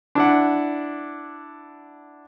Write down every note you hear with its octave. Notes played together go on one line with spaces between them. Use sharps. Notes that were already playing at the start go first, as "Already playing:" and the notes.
D4 E4 F#5